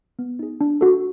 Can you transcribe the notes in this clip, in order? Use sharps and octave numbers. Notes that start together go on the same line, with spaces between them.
B3
D#4 G#4
D4
F#4 A4